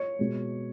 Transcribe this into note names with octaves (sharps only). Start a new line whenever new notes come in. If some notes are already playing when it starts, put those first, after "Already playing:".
Already playing: C#5
B2 G#3